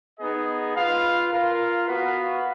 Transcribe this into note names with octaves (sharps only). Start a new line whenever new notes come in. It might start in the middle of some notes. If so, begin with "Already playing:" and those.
B3 D#4 G#4 D#5
F4 B4 F5
F4 A#4 F5
B3 F#4 B4 F5